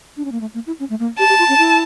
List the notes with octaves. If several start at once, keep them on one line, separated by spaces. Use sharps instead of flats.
D4
C#4
A#3
A3
A#3
E4
C#4
A3
A#3
G4 A5
G4
F4
C#4
E4